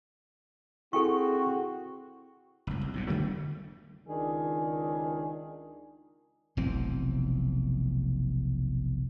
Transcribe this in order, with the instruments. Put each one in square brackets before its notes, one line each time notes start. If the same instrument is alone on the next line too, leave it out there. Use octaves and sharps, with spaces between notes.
[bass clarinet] C4 [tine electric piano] E4 G#4 [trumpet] F#4 [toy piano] A4 G5 C#6
[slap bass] F#1 C#2
C2
B1 G#2 C3
C#3 F#3 A3 A#3
[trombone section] C#2 D#3 D4 G#4
[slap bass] F1 B1 E3 C4